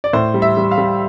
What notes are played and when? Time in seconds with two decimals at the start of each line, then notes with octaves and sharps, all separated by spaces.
0.04 D5
0.13 A2 C5
0.34 G3
0.42 E5
0.57 G3
0.71 F5
0.78 G3